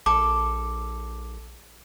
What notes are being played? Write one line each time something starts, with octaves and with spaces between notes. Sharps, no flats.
A#1 A4 D6